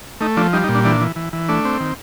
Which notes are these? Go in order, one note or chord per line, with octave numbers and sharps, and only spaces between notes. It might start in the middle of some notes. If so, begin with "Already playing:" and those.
A3 D#4
F3 D4
G3 D#4
D#4
A#2
D4
E3 D4
E3
E3
E3
A3 D4
C4
D#3